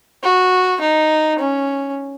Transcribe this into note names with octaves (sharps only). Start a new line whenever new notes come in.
F#4
D#4
C#4